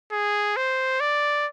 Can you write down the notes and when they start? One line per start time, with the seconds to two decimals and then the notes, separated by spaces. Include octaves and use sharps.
0.12 G#4
0.56 C5
1.00 D5